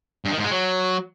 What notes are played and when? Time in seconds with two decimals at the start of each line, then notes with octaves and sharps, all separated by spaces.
0.25 G2
0.31 D#3
0.38 G#2
0.44 G#3
0.51 F#3